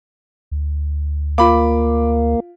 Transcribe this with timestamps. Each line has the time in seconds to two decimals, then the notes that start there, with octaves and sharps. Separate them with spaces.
0.51 D2
1.38 A#3 F4 F5 B5 D6